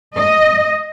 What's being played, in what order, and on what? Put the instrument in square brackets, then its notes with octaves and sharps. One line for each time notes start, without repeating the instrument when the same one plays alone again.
[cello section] D#5